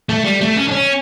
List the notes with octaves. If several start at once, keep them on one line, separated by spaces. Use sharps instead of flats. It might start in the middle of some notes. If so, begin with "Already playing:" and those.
A3
G3
A3
C#4
D4
C#4